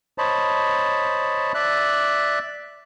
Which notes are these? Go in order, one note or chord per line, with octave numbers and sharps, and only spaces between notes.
C5 C#5 D#5 A5 B5
D5 E5 F#6